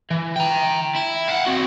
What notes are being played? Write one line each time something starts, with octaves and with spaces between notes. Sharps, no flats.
E3
G5 A#5
E4
F5 F#5
C4 F#4